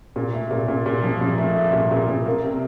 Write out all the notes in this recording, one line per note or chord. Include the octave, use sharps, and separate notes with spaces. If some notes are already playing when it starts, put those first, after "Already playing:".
A#2
A3
A#2
A#2
A#2
F3
A#2
A3
A3
A#2
A#2
A#2
A#3
C3